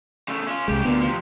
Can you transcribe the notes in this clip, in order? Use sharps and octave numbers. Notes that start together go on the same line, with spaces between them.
C#3 A3
C#4 F4
C2 C#3 G#3 G4
D2 A#2 D3 B3
C3 F3